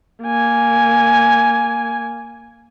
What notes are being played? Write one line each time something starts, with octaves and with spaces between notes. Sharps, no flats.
A#3 G#5